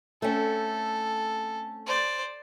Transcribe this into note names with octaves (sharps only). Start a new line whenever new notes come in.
A3 C4 C#4 A4
C5 D5